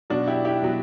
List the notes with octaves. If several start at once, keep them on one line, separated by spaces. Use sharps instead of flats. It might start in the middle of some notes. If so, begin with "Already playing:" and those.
B2 F#3 D4 F#4
E4 G4
E4 G4
B2 F#3